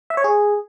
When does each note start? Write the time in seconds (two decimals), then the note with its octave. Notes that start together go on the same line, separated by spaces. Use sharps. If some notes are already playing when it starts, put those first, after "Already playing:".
0.10 E5
0.17 C#5
0.24 G#4